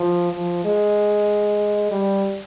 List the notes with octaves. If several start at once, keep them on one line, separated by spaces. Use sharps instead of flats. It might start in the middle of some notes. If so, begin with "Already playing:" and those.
Already playing: F3
F3
G#3
G3